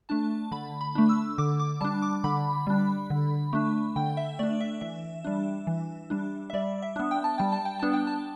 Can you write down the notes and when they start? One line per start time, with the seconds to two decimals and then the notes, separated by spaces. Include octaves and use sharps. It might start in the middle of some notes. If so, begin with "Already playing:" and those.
0.09 A3 D4 A5
0.52 D3 B5
0.81 B5
0.95 A3 D4
1.09 E6
1.38 D3 D6
1.59 D6
1.81 G3 D4 A5
2.02 D6
2.24 D3 B5
2.67 G3 D4
3.10 D3
3.53 A3 D4
3.96 D3 G5
4.17 E5
4.39 A3 D4 D5
4.61 E5
4.81 E3 E5
5.24 G3 D4
5.67 E3
6.10 G3 D4
6.50 E5
6.53 G3 D5
6.82 E5
6.96 B3 D4
7.11 G5
7.24 A5
7.38 G3 G5
7.52 A5
7.65 G5
7.79 B3 D4 A5
7.93 G5
8.07 A5